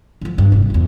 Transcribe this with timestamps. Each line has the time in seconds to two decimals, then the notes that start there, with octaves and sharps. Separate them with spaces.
0.21 D3 F3
0.38 G2
0.52 F1
0.70 G1 E2